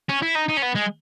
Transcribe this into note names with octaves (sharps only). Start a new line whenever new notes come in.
C#4
E4
D#4
D#4
C#4
B3
G#3